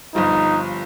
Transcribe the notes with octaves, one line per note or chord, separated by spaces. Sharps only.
G1 G2 F3 D#4